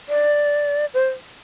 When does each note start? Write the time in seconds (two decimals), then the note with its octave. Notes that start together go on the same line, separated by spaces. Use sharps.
0.09 D5
0.94 C5